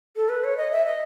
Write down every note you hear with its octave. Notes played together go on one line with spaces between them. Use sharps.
A4
B4
C#5
D#5
E5
D#5